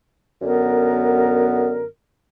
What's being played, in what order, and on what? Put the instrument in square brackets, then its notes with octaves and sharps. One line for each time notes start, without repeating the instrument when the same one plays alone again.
[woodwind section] F#2 D3 B3 A#4